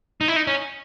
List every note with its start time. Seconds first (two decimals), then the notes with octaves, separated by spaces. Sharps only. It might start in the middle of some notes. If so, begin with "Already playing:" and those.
0.21 D#4
0.28 E4
0.36 D#4
0.47 C#4